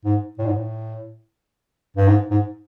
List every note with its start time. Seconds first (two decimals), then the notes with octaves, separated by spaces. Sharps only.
0.05 G#2
0.39 A2
0.46 G#2
0.54 A2
1.97 G2
2.08 G#2
2.31 G#2